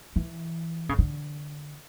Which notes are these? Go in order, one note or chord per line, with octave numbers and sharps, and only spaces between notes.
E3
C#3
D3